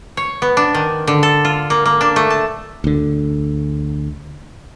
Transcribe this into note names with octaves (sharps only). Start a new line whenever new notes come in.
C#5
B3
D4
D#3
D3
A4
F4
A#3
A#3
D4
A3
A5
D2 D3